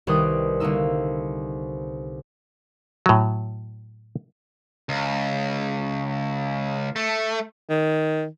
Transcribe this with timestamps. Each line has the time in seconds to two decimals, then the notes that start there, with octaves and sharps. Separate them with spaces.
0.07 C2 D#3 B4 D5 G5 D#6
0.60 C2 D3 A#3 D#4 E6
3.06 A2 F#3
4.89 C#2
6.96 A3
7.70 D#3